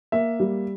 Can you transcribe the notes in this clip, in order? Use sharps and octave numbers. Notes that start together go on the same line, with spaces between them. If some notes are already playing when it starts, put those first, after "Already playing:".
A#3 E5
G3